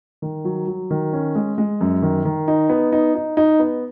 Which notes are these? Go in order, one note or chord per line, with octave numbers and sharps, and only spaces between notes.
D#3
F#3
F#3
D#3
C#4
G#3
G#3
F#2
D#3
D#3
D#4
B3
D#4
D#4
D#4
B3